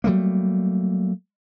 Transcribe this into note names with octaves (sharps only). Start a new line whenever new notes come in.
F#3 G3 A3 A#3